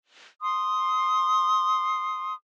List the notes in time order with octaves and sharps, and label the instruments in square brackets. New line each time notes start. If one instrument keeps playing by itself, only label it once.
[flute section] C6 D#6